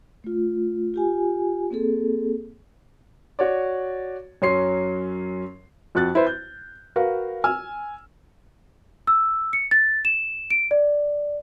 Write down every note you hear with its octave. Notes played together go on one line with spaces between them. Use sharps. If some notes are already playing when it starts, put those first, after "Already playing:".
A3 F4
F4 G4 G#5
A#3 C4 G#4 A4
F#4 C#5 D5
F#2 F#3 C#4 C6 C7
F2 F#4 F#6 A6
E4 B4 C5
G6
F#4 A#4 B4 F5
G#5 E6 F6
E6
C#7
A6
E7
D7
D5